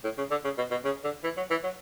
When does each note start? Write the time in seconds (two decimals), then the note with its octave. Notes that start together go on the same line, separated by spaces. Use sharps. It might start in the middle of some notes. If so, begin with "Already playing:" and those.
0.04 A2
0.18 C#3
0.31 D3
0.44 C#3
0.58 B2
0.71 B2
0.84 C#3
1.04 D3
1.24 E3
1.37 F#3
1.50 E3
1.63 F#3